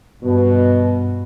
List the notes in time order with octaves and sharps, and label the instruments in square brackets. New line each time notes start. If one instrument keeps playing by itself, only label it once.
[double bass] G2 [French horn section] B2